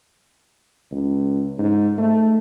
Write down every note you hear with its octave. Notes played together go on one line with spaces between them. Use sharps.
C#2
G#2
A3